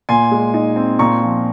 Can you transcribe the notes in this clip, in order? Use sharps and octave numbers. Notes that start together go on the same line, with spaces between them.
A#2 G#5 C6
G#3
D#4
C4
A#2 A#5 C#6
F3